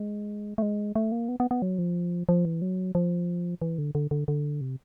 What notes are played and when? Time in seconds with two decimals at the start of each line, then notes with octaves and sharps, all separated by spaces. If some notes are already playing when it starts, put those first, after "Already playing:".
Already playing: G#3
0.58 A3
0.62 G#3
0.96 A3
1.12 A#3
1.29 B3
1.40 B3
1.51 B3
1.62 F#3
1.79 F3
2.29 F3
2.45 E3
2.62 F#3
2.95 F3
3.62 E3
3.78 D3
3.95 D3
4.11 D3
4.28 D3
4.61 C3